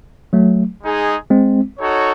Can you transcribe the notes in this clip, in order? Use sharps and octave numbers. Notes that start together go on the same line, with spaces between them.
F#3 A3
G#3 D#4 G#4
G#3 C4
D#4 F#4 A4 C#5